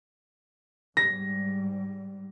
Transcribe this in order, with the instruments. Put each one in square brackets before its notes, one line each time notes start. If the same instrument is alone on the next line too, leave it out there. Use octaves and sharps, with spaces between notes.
[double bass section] G#2 G3 [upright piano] A#6